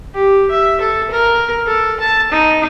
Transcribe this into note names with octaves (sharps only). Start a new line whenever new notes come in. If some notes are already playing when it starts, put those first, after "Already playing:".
G4
E5
A4
A#4
A4
A5
D#4